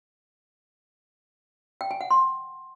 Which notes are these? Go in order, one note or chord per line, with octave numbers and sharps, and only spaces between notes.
G5
G#5
F#5
C6